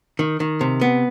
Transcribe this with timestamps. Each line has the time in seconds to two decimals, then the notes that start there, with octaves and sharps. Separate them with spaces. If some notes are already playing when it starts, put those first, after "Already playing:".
0.19 D#3
0.40 D#3
0.61 C3
0.81 B3